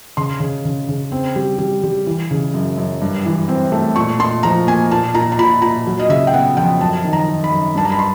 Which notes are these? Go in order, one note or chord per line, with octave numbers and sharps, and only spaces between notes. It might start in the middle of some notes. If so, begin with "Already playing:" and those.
C#3 C6
C#3
C#3
C#3
C4
G3
G3
G3
E3
C#3
F#2
F#2
G2
E3
C4
A3
A#2 C#6
A#2 C6
F3 A#5
A#3 G#5
A#2 A5
A#2 A#5
A#5
A#2 B5
A#2 A#5
F#3
D#5
C#3 E5
G5
B3 F#5
F2 G5
F#2 A5
D#3
A#5
D#3
B5
F#2
G2 A5
A#5
B5
C6